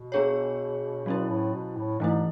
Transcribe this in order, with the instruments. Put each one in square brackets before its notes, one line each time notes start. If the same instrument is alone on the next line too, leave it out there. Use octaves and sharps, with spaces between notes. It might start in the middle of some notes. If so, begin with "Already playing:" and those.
Already playing: [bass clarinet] B2
[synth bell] B3 D4 G#4 C#5
[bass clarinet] B2 [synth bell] F#3 C#4 E4
[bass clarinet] A2
B2
A2
[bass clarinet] G#2 [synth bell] E3 A3 E4